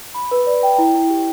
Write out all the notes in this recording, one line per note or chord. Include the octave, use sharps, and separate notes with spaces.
B5
B4
D5
G5
E4
E4
G4